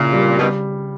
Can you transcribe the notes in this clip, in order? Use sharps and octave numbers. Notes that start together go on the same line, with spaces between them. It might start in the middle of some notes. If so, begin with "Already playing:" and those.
Already playing: A#2 C#3 E4
G3
B2 D#3 G3